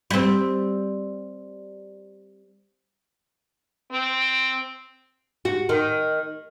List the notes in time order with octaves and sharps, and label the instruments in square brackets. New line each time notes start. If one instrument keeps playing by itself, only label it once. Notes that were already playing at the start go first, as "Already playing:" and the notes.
[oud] G3 C4
[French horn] C4
[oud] F#4
D#3